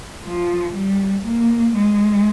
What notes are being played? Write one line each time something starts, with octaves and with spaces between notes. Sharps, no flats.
F3
G3
A#3
G#3